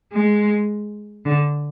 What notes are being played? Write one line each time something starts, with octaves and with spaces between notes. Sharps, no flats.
G#3
D3